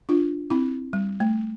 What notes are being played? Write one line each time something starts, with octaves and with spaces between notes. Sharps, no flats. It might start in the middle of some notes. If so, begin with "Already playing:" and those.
D4 F4
C4 E4
G3
A3